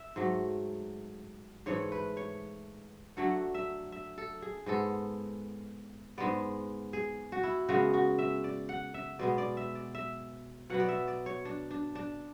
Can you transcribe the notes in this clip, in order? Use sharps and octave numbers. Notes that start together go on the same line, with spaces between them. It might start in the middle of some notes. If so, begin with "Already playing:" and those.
Already playing: E5
G#2 F#3 A3
G#2 E3 A3 C#5
B4
C#5
D3 F#3 A3 F#5
E5
E5
A4
G#4
G#2 G#3 B3 A4
G#2 G#3 B3 D5
G#4
F#4
E4
C#3 G#3 B3 F#4
F#4
E5
D5
F#5
E5
B2 G#3 B3 D5
D5
E5
D5
E5
B2 F#3 B3 F#5
D5
E5
D5
C#5
D4
D4
D4